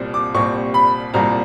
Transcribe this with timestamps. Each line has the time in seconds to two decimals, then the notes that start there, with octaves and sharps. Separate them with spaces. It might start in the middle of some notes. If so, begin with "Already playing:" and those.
Already playing: C2 A#2 G3 C4
0.14 D6
0.34 C2 A#2 G3 C4 C#6
0.74 B5
1.14 C2 A#2 G3 C4 A#5